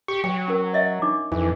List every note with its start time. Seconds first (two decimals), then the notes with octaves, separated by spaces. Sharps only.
0.08 G4 C#6
0.24 F#3 G5
0.48 C#4 A#4
0.73 C#5 D#5 E5
1.02 D4 D#4 D6
1.32 F2 E3